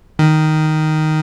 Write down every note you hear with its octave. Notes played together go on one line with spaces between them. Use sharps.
D#3